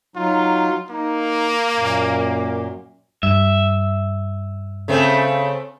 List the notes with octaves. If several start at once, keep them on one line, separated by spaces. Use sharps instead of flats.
F#3 D#4 F4
A#3 D#4
F#2 A#2
G2 E5
C#3 A3 C4